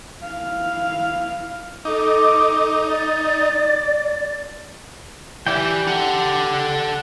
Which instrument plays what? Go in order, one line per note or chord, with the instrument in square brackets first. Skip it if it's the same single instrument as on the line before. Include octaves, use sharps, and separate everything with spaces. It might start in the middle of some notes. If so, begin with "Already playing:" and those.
[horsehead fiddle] E4 F5
[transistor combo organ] D#4 [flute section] A4 D#5 D6
[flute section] D5
[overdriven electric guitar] E3 [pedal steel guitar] G4 D5 G5
[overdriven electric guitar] A4 F#5